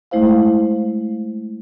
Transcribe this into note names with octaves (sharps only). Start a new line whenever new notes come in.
G#3 A3 E4 C5 F5